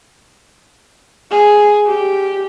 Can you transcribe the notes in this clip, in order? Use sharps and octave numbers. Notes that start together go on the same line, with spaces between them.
G#4
G4